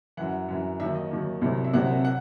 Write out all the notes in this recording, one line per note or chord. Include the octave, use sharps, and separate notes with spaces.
F#2 E3 F#5
F#2 E3
D#2 D#3 F#3 E5
D#5
D#2 D#3 F#3
C2 C3 F#3
E5
C2 C3 F#3 F#5
F#5